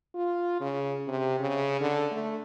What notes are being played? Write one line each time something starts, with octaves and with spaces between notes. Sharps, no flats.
F4
C#3
C3
C#3
D3
A3